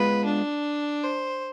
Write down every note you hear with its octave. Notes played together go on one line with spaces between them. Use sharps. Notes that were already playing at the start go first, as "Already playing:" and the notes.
Already playing: G#3 B3 F4 B4
D4
C5